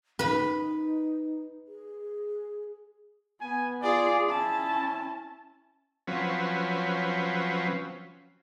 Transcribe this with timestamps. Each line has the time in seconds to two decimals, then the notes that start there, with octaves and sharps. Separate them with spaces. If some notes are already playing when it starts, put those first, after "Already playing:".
0.19 D#4 B4 B5
1.67 G#4
3.41 B3 G#5
3.83 F4 G#4 D5
4.27 C#4 E4 A5
6.07 F3 F#3 C4 C#4 B4